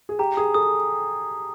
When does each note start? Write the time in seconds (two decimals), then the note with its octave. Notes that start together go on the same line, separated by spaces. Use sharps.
0.09 G#4
0.19 G4 A#5
0.37 G#4 D#6
0.54 A4 D#6